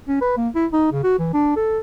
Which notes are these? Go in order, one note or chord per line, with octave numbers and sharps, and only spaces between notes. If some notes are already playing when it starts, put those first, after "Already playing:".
C#4
B4
A#3
E4
D#4
C#3
F#4
E3
D4
A4